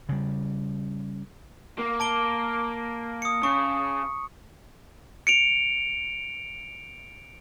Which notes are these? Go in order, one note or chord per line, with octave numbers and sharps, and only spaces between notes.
C#3 G3
A#3
A5 D7 G7
D#6 C#7
C#3 C#6
C#7 D7 F7